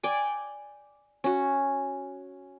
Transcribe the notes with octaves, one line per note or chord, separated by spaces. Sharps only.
D5 G5 G#5
C#4 F#4